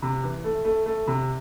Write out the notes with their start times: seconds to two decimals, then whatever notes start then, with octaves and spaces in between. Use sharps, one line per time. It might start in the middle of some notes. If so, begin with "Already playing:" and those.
0.02 C3
0.23 E3
0.44 A3
0.65 A3
0.86 A3
1.07 C3